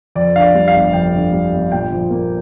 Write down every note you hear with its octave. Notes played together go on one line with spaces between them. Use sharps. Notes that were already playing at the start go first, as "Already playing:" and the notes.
F2 D5
D3 F5
D5
G3
F5
G1
F2 G5
D3
G3
G1
A#2 G5
F3
A#3